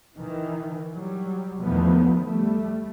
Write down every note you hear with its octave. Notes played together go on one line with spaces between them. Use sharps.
D#3 E3
F#3 G3
E2 D3 D#3 F3 A3 B3
G3 A3